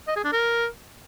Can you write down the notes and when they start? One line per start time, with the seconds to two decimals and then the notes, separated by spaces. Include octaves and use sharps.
0.07 D#5
0.16 G#4
0.24 D4
0.33 A#4